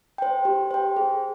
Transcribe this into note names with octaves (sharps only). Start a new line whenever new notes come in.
C5 G5
G4
C5 G5
G#4